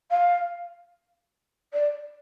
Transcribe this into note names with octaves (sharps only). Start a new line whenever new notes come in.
F5
D5